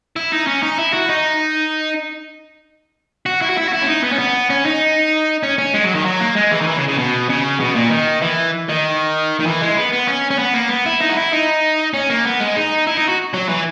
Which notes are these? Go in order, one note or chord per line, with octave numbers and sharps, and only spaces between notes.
E4
D#4
C#4
D#4
E4
F#4
D#4
F#4
E4
F#4
E4
F#4
E4
C#4
D#4
B3
C#4
B3
C#4
D#4
C#4
C#4
G#3
F#3
D#3
F#3
A#3
G#3
E3
D#3
E3
C#3
C#3
B2
C#3
B2
A#2
D#3
E3
D#3
D#3
E3
G#3
B3
B3
C#4
C#4
B3
A#3
B3
E4
D#4
F#4
E4
D#4
C#4
A#3
B3
G#3
D#4
E4
D#4
F#4
F#3
E3